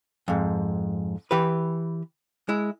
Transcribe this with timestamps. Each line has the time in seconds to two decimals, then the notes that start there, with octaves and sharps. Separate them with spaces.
0.28 F2 G#2
1.31 E3 G4 B4
2.49 G#3 E4